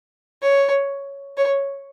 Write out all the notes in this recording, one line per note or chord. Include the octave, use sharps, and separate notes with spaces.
C#5
C#5